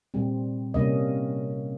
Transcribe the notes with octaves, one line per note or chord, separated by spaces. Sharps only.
A#2 G3 C4
C3 G3 A#3 C#4 D#5